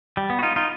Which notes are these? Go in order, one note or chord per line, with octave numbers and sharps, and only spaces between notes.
G3
B3
F#4
D#4 F4
D#4 F4